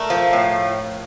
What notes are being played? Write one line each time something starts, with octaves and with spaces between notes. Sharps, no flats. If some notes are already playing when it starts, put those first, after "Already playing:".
Already playing: A3 A#4
F3
A2